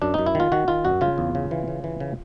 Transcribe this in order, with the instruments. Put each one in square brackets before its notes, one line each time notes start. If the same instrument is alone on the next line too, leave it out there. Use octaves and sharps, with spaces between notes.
[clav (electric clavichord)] F#2 D4
F#2 D#4
E4
D#3 F4
D#3 F#4
D#3 F4
F#2 F#4
C#3 F4
E2
C#3
E3
C#3
E3
C#3